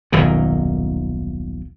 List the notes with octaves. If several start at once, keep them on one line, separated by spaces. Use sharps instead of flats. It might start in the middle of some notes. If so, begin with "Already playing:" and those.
D#1 B1 F#2 D#3